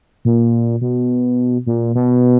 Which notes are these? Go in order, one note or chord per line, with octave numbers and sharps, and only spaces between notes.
A#2
B2
A#2
B2